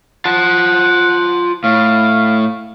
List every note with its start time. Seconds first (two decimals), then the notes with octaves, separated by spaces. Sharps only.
0.25 F4 F#5 A5
1.64 A2 F5